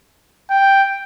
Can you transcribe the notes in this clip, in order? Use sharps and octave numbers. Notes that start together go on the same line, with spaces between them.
G5